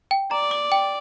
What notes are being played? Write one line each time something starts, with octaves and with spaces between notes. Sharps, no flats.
G5
D5 A#5
D6
G5